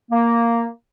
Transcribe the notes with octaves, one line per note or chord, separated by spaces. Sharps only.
A#3